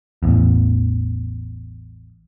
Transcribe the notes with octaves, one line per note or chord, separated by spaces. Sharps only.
A1 E2